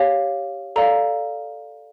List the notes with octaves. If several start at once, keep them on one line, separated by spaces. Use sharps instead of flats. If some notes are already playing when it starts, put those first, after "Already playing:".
Already playing: G4 C#5 F5
A4 D5 F5 A#5